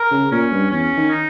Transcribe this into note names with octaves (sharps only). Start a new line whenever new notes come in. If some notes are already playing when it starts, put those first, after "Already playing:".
Already playing: A#4
C#3
A#2 C#4
G2
E2 C#4
D#3
D#4